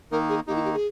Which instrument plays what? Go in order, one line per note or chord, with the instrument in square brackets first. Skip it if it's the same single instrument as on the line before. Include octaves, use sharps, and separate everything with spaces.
[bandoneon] D#3 A#3 D#4 [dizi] A#4
[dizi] G#4
[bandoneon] D#3 A#3 D#4 [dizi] G4
[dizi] E4
G4
G#4